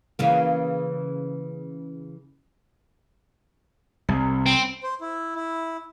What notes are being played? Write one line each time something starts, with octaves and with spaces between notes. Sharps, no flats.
C#3 E3 A#3
C2
C4
C5
E4
E4